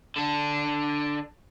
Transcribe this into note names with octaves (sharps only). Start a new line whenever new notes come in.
D3 D4